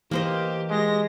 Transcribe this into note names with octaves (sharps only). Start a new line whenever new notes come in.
E3 A#3 G4 C5 D#5
G#3 G4 A#6